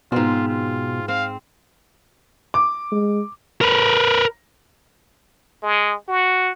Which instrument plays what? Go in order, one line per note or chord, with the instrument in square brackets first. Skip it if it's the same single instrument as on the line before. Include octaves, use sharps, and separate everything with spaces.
[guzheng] G#2 C4 [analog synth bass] B2 [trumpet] F4
[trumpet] F4
[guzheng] C4 [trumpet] F5
[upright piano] D6
[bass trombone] G#3
[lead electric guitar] A#4 B4
[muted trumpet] G#3
F#4